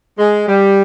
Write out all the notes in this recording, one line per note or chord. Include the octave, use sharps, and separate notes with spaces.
G#3
G3